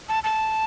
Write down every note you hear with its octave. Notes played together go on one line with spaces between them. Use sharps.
A5
A5